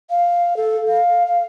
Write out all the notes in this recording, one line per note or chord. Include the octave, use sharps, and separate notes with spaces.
F5
A4
F5
F5